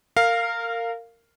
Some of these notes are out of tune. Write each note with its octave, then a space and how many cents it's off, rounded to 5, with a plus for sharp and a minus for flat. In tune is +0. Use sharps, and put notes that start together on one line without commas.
A#4 -25 F5 +0